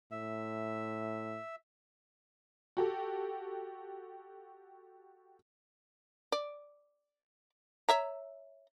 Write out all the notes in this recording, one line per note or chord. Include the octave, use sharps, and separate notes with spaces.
A2 E5
F#4 G4 A4
D5
C#5 E5 A#5